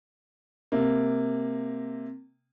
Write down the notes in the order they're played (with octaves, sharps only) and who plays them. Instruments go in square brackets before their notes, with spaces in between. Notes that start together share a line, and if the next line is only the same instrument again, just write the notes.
[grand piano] C3 A#3